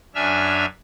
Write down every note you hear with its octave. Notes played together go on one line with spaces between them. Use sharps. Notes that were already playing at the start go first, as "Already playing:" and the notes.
F#2 D4 E5 G#5 F6